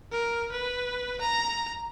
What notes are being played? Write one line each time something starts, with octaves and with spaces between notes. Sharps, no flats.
A#4
B4
A#5